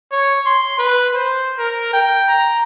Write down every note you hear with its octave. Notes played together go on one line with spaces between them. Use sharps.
C#5
C6
B4
C5
A#4
G5
A#5